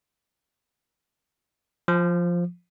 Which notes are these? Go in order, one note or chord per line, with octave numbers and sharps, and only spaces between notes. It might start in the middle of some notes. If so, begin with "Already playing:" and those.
F3